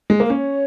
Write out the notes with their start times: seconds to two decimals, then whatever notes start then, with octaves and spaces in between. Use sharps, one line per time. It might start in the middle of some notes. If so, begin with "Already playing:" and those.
0.10 G#3
0.20 A#3
0.25 A#4
0.30 C#4 C#5